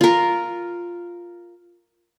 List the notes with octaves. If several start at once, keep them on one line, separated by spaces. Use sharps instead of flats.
F4 A#4